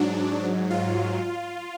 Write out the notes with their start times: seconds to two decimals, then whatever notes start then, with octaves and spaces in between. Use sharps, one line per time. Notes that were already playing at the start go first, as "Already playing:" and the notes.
Already playing: G#2 F#3 D4
0.70 F4